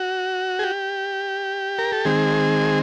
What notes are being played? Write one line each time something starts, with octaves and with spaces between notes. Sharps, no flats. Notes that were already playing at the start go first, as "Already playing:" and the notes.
Already playing: F#4
G#4
G4
A#4
A4
D#3 G#3 C4 G#4